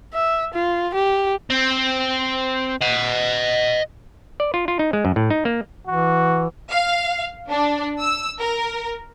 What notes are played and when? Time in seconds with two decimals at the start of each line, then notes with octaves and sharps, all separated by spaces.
0.13 E5
0.54 F4
0.94 G4
1.50 C4
2.82 D#5 F#5
4.40 D5
4.54 F4
4.68 F4
4.79 D#4
4.93 G#3
5.05 F#2
5.16 A2
5.30 D#4
5.45 A#3
5.87 E3 F#4
6.71 F5
7.50 D4
8.02 E6
8.40 A#4